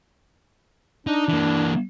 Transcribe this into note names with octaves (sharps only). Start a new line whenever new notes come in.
D4 D#4
E3 A#3